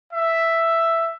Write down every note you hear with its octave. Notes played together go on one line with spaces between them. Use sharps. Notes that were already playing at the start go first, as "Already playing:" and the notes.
E5